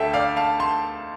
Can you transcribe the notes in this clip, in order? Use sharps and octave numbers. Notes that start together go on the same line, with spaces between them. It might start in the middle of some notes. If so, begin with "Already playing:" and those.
Already playing: D2 D3 A3 E5 G5 A5
D5 F5
F5 A5
A5 C6